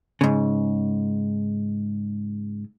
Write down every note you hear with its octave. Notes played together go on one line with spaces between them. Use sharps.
G#2 C#3